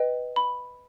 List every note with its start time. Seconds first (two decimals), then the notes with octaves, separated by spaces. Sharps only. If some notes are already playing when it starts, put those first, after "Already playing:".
Already playing: B4 D#5 G5
0.36 B5